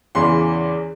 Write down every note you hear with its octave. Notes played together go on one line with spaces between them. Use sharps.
E2 C#3 E3 C6